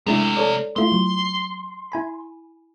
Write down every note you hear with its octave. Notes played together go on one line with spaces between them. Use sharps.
C3 G#3 A3 D4 E4
A4 C#5 D5
A3 E4 F4 C6
F#3
E4 G#5 B5